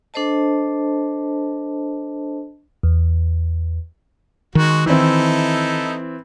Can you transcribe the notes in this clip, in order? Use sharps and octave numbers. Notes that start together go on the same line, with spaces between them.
D4 A4 C5 D#5 A5
E2
D#3 G#3 F#4
E3 C4 D#4 E4 A4